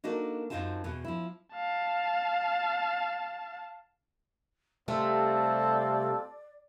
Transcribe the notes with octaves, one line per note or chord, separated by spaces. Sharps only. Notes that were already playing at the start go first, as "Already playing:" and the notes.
A#3 D4 D#4 F#4 A4 A#4
F#2 A#2 C4 D#4 F4 A5
E2 B2
F3 E4
F5 A5
C3 G3 A3 C4 F4 A4 D5